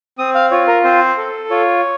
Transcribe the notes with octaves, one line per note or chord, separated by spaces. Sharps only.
C4 D#6
F5
F4 C#5
A#4
C4 C5
A4
F4 C#5